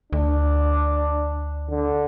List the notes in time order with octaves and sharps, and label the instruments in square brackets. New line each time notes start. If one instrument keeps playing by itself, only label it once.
[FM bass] D2 [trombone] D4
[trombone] D3